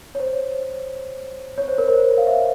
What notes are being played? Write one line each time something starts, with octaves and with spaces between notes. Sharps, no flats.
C#5
C5
C#5
C5
A#4
C5
F5
E5